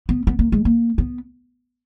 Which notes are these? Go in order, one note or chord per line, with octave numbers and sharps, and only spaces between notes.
B3
B3
A#3
G#3
A#3
B3